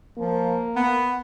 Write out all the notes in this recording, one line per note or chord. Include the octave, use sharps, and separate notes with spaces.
F3 A#3
B3